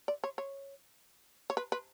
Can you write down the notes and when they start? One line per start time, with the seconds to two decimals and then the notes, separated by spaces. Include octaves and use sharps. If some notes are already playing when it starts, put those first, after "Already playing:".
0.08 D5
0.24 C#5
0.38 C#5
1.50 C#5
1.57 B4
1.72 B4